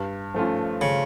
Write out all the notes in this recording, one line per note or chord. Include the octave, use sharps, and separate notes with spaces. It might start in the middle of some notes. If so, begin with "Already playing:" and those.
Already playing: G2
F3 A3 C#4 F4
C#3